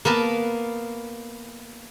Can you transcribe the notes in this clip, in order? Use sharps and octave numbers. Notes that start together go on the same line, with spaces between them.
A#3 B3 A#4 A5